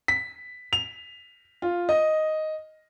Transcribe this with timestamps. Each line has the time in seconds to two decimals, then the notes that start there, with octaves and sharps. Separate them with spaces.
0.08 B6
0.73 F7
1.62 F4
1.89 D#5